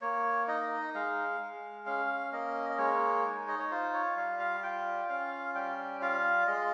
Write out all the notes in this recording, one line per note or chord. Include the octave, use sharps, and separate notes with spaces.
A#3 C#5
D#4 D#5
G#3 F5
G#3
C#4 F5
A#3 D#5
D#5
G#3 C#5
D#4
D#5
C#5
F4 C5
C#5
G3 F5
F5
F4 G5
C#4 F5
G3 G5
F4 F5
G#3 D#5